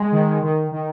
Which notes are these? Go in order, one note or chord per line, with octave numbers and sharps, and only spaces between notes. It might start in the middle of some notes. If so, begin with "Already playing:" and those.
Already playing: G#3
D#3
D#3
D#3